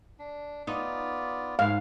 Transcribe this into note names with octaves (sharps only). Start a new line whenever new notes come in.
D4
B3 D#4 F4 D5
G#2 F5